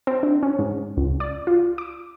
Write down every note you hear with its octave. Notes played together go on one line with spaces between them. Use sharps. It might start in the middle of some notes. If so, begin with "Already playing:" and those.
C4
D4
C#4
G#2
C#2
D5
F4
D6